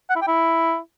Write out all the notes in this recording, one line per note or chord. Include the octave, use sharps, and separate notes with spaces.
F#5
E4
G5
E4